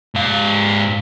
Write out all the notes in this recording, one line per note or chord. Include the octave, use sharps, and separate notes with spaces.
G#2 F5